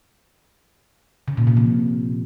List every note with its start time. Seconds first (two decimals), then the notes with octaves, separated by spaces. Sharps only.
1.28 C#3
1.37 A#2
1.47 C3
1.57 F3